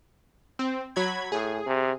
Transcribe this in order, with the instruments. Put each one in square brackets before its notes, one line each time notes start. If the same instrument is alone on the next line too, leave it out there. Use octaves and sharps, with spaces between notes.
[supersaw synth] C4
F#3 B5 G#6
[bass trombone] A2 [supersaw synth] G#4
[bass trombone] C3